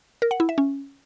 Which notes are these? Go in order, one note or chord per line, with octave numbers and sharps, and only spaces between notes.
A#4
F#5
E4
E5
C#4